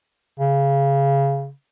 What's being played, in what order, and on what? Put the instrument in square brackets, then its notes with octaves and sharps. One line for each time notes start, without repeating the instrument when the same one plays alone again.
[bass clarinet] C#3